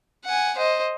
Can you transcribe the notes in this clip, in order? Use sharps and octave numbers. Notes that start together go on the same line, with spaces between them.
F#5 G#5
C5 D#5